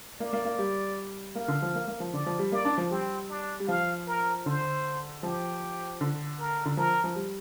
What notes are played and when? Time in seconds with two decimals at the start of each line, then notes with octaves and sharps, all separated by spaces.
0.20 A#3 D5
0.33 A#3
0.45 A#3
0.59 G3
1.35 A#3 F5
1.48 D3
1.62 F3
1.75 A#3
1.87 A#3
2.00 F3
2.13 D3 D5
2.26 F3
2.39 G3
2.52 A#3 D5
2.65 D4
2.78 F3
2.91 G3 C4
3.29 D4
3.60 G3
3.68 F3 F5
4.07 A#4
4.45 D3 C5
5.22 F3 G4
6.01 D3
6.39 A#4
6.65 D3
6.77 F3 A#4
7.04 F3
7.16 G3